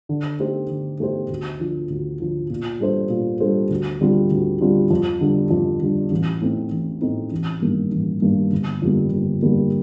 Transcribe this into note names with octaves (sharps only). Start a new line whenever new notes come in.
D3
A3 D#4 G4 C5
D3
A3 D#4 G4 C5
D2
D3 F3
D2
D3 F3
A#2
G3 D4 A4 C5
A#2
G3 D4 A4 C5
D2
D3 G3 C4 F4
D2
D3 G3 C4 F4
F2
D3 G3 D4
F2
D3 G3 D4
A1
A2 A3 C4 D#4
A1
A2 A3 C4 D#4
A1
G2 D#3 A#3
A1
G2 D#3 A#3
G1
F2 D3 G3 A#3
G1
F2 D3 G3 A#3